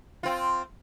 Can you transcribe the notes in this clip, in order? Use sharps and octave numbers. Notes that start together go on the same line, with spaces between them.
C4 F4